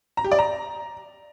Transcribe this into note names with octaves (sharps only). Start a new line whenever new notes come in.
A#5
G4
D5
A#5